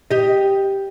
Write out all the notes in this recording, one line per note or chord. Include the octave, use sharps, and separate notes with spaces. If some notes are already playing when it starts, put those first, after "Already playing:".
G4 D#5